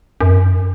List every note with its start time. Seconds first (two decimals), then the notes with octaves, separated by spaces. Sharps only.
0.21 F#2